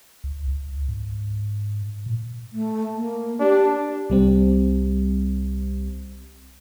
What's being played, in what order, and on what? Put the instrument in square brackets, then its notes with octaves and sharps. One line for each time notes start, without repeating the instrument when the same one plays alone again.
[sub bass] C#2
C#2
G#2
A#2
[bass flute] A3
A#3
[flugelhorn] D4 [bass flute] G4
[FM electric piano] C2 G3 C4